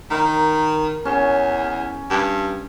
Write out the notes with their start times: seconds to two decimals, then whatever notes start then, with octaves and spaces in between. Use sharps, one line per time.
0.11 D#3 A#4 B5
1.05 E2 C#4
2.10 G2